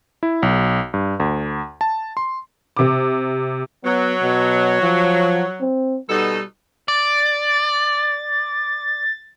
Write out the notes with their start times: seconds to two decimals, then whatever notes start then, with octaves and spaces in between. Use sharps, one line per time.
0.23 E4
0.43 B1
0.94 G2
1.20 D2
1.81 A5
2.17 C6
2.77 C3 D6
3.84 F#3 B3
4.22 B2
4.82 F3
5.61 C4
6.09 B2 G3 D#4 A4
6.88 D5 A6